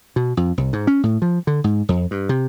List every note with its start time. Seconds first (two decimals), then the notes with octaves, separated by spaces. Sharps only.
0.16 B2
0.37 F2
0.58 C2
0.73 G#2
0.87 C#4
1.03 A2
1.22 F3
1.47 D3
1.64 G#2
1.89 F2
2.11 G2
2.29 C3